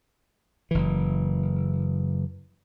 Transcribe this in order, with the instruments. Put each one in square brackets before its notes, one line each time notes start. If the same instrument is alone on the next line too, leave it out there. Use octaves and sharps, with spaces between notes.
[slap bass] F#1 E3